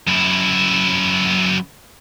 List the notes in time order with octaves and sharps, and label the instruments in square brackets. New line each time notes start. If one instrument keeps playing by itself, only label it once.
[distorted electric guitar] F#2 E4